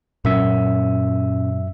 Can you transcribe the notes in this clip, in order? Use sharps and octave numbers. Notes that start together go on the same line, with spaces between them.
F#2 A#2 C#4 E5